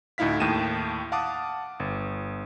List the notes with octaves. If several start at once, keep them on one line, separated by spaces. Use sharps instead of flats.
D2 A2 D#4 E4 F5 B6
D#2 A2 G5 A5 D#7 E7
F5 F#5 A5 D6 D#6
G1